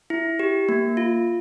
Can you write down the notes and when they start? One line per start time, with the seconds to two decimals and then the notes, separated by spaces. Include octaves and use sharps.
0.10 E4
0.39 G4
0.69 A#3
0.97 F4